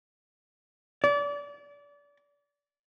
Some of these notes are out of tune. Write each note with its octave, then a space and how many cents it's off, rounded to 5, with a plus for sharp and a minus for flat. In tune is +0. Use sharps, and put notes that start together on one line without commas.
D5 -30